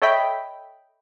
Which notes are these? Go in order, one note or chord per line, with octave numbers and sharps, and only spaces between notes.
A4 C#5 D#5 E5 G5 B5